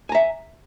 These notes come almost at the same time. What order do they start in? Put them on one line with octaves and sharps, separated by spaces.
G#5 A#5 E5